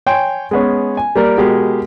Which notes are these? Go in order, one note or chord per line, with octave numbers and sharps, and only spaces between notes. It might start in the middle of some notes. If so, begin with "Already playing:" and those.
C#5 G5 G#5 C6
G#3 B3 C#4
G#5
G3 A#3 A#4 D5
B2 G#3 G4 A#4